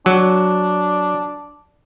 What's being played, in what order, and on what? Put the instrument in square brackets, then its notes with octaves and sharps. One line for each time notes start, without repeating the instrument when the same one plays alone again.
[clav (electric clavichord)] F#3 [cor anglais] D4